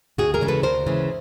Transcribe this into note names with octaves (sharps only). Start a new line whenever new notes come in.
D2 F#4 G#4
G#4 A#4
C#3 E3 G#3
A4 B4
D2 A#4 C5
C#3 E3 G#3